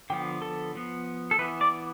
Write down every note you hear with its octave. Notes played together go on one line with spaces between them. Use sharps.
D3 F3 B3 G5
A4
F3 B3
A4
E3 B3 B4
D5